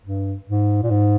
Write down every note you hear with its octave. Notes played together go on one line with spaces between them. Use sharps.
G2
G#2
A#2
G#2